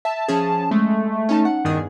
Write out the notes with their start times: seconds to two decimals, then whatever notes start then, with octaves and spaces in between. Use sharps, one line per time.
0.05 E5 A5
0.28 F3 C#4 G#4
0.71 G#3 A3
1.29 C#4 D#4 A5
1.45 F#5
1.64 E2 G2 D#3 G#4